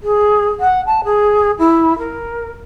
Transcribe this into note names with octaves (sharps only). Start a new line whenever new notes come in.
G#4
F#5
A5
G#4
E4
A#4